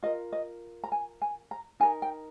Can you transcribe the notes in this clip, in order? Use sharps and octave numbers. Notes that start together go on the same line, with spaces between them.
F4 A#4 D#5
D#5
A#5
G#5
G#5
A#5
D#4 A#4 G#5
G5